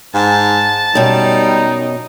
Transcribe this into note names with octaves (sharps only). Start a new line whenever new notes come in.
G#2 A5
F#2 B2 G3 D#4